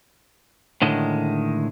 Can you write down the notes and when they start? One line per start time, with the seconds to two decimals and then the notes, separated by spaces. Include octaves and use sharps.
0.82 A2 D3 D#3 G#3